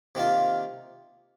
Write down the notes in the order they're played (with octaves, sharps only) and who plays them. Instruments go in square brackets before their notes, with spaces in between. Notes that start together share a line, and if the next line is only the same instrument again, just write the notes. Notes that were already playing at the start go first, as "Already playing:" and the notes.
[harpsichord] C3 D#3 A#3 F4